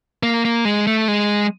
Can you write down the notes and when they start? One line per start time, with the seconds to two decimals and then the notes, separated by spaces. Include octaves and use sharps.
0.23 A#3
0.45 A#3
0.65 G#3
0.87 A3
1.08 G#3